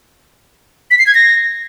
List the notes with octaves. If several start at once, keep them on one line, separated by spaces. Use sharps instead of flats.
B6
C7
G#6
A#6